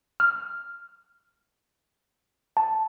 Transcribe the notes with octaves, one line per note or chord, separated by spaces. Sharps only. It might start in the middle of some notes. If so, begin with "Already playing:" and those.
F6
A5